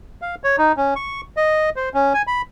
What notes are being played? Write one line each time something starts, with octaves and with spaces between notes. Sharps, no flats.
F5
C#5
D#4
C#4
C#6
D#5
C5
C#4
G#5
B5